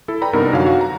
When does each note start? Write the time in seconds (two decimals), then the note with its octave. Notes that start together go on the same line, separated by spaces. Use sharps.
0.08 E4 A4
0.21 B4 D5 G5 A#5 B5
0.33 G2 C3 B3 D#4 A#4
0.53 F#2 D3 F#4 C#5 F5
0.66 F#4
0.81 A#5